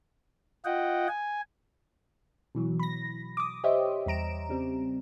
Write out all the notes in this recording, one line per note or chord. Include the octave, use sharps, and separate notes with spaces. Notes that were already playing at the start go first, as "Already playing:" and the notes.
F4 D#5 F#5 G5
G#5
B2 E3 F#3
B5 A#6
D6 D#6
G4 C5 C#5 D#5 E5
E2 G3 A#5 D7 E7
C#3 G3 C4